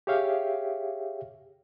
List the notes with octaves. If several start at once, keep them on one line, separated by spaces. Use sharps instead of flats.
G4 G#4 C#5 E5 F5 G5